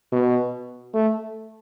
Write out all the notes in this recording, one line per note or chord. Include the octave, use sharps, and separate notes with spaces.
B2
A3